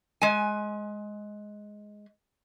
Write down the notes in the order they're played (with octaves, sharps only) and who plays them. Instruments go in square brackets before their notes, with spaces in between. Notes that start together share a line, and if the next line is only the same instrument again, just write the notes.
[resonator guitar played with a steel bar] G#3 G#5